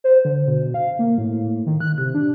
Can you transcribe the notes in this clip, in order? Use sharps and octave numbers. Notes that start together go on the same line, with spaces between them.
C5
D3
B2
F5
A#3
A2
D#3
F#6
C3
D4